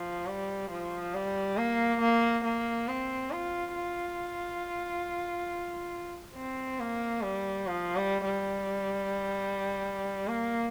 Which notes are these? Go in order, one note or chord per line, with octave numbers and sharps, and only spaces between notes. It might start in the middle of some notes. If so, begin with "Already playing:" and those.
Already playing: F3
G3
F3
G3
A#3
A#3
A#3
C4
F4
F4
C4
A#3
G3
F3
G3
G3
A#3